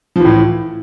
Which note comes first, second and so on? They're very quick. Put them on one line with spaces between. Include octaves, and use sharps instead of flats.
F3 E3 A2